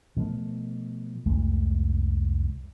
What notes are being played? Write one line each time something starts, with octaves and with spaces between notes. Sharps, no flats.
B2 F3 A3
C2 F2 G#3 A3